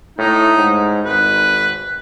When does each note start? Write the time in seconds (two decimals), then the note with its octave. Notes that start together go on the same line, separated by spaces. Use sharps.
0.18 A2 D#4
0.58 G#2
1.05 G#1 B4